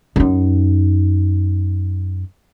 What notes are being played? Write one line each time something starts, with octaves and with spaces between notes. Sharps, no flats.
F#2 D#4